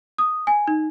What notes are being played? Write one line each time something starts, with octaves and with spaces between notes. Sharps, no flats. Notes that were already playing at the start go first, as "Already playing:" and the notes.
D#6
G#5
D#4